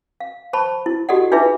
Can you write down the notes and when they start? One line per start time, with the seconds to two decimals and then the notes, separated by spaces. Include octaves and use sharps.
0.20 F5
0.53 C5 A5 B5 C#6
0.86 E4
1.09 F#4 G4 A4 D5 D#5 F#5
1.32 D4 D#4 F4 G#4 B4 E5